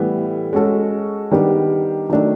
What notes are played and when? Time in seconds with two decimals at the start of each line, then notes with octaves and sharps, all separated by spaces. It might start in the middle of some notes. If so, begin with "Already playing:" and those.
Already playing: A2 E3 G3 B3
0.53 G#3 C#4 F#4 A4
1.31 D#3 G3 B3 D4 G4
2.10 D#3 F#3 A3 D4